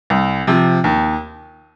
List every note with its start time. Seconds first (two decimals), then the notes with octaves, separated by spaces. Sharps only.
0.10 C2
0.47 C3 F3
0.84 D#2